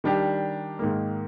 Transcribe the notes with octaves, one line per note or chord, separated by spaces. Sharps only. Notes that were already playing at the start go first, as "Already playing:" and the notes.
D#3 G3 D4 G4
G#2 D#3 A#3